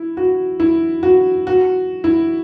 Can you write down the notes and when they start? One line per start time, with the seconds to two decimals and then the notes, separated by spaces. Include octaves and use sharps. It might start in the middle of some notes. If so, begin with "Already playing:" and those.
Already playing: E4
0.17 F#4
0.60 E4
1.03 F#4
1.47 F#4
2.04 E4